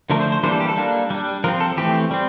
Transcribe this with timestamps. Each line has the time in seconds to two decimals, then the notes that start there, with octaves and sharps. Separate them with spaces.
0.10 D3 F3 A3 D4 A#4
0.21 C5
0.32 C5
0.43 E3 G3 A#3 D4 C5
0.52 A4
0.60 G4
0.69 A4
0.77 G3 A#3 D4
1.10 G3 D4
1.44 F3 C4 A#4
1.60 A4
1.77 E3 A3 C4 G4
2.11 G3 C4